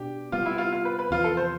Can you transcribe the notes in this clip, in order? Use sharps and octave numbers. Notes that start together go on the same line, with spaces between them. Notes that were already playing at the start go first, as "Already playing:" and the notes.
Already playing: B2 B3 D4 G4
C3 G3 B3 F4
E4
F4
F4
B4
B4
E2 C3 F3 F4
A4
C5